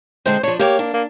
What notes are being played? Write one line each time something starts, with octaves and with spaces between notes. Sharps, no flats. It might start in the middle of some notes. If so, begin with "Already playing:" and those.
D3 G#3 C4 C5
F3 D4 C#5
A#3 G4 C#5 G5
D4
A#3